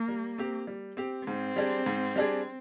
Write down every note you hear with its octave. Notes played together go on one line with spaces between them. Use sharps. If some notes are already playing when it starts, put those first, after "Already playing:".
Already playing: A#3
G3
C4 G4
G3
C4 G4
G#2 C4
G3 D4 G#4
G#2
G3 D4 G#4